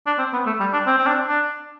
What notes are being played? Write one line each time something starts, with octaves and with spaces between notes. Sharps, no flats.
D4
C4
B3
A3
G3
D4
C4
C4
D4
D4